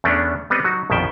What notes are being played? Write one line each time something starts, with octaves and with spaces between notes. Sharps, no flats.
E2 A3 B3 C#4 D4
G3 B3 C4 B4 D#5
F#3 D#4 F#4
A#1 F2 B2 D#3 E5 G5